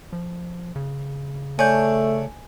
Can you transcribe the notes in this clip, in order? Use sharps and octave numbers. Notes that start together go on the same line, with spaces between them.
F3
C#3
A3 D4 C#5 G#5 G6